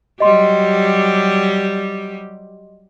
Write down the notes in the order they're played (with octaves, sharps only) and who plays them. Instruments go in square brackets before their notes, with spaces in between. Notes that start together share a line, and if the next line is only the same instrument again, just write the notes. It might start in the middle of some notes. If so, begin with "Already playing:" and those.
[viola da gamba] F#3 G3 G4 [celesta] D#5 C6